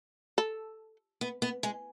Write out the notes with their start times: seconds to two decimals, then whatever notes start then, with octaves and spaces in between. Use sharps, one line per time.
0.38 A4
1.21 B3
1.42 B3
1.63 G#3